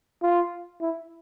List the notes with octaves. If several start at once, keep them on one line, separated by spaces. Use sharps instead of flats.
F4
E4